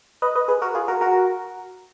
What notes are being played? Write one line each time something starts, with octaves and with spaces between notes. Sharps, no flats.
B4 D#5
B4 D#5
G#4 B4
F#4 A#4
F4 G#4
F#4 A#4
F#4 A#4